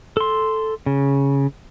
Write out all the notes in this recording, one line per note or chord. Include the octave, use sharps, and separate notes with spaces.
A4 C6
C#3